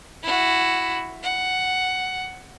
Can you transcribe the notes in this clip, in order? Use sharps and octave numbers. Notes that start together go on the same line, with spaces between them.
E4 F#4
F#5